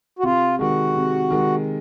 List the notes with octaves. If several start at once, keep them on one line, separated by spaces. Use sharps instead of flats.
F#4
C3 F4
D#3 G#3 F#4
C3
D#3 G#3